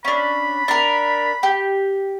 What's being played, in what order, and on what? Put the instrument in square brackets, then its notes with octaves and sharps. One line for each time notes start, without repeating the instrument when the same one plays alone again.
[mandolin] C#4 D4 [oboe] B5
[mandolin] D4 A#4
G4